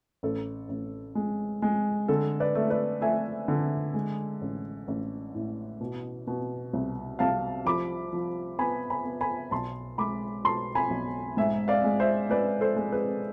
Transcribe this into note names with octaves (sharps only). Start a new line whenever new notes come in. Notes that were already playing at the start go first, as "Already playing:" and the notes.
A1 A4
A1
G#3
G#3
D3 A4
B4 D5
A3
B4 D5
A3 E5 G#5
D3
G#3
A1
A1
A2
B2
B2
C2
C2 F5 A5
F3 B5 D6
F3
B3 G#5 B5
G#5 B5
B3
G#5 B5
B1 A5 C6
G#3 B5 D6
B2 A5 C6
G#5 B5
B1
G#2 E5 G#5
D5 F5
G#3
C5 E5
G#3 B4 D5
A4 C5
G#3
G#4 B4